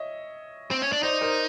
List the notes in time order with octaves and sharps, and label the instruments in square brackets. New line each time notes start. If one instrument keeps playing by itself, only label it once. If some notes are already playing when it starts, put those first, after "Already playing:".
Already playing: [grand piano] C#5 D#5 E5
[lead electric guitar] C4
C#4
D4
[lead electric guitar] D#4 [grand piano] C5 D5
[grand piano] A#4 C5